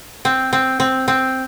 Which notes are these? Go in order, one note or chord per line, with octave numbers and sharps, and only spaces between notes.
C4
C4
C4
C4